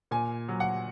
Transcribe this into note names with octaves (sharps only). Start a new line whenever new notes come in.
A#2 G#5
F#3
F#5